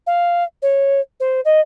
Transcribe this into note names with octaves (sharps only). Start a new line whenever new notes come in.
F5
C#5
C5
D#5